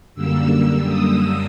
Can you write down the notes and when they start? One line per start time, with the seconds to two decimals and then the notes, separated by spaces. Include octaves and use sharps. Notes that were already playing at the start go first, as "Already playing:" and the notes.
0.15 F#2 D3 G3 A#3 E6
0.85 D#6